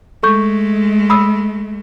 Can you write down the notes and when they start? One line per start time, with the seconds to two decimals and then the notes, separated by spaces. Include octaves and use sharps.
0.23 G#3 A3 A4 C#6 G6
1.10 B5 D#6 E6